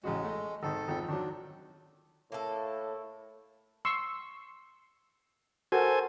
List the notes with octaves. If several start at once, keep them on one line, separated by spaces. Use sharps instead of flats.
A1 C#3 G#3 F#4
A3 D#5
G#1 D#3 A4
G#1 F2 G5
D#3 F#3 D4
A2 A#3 A4
C6 C#6 E6
F#4 A4 A#4 C5 G#5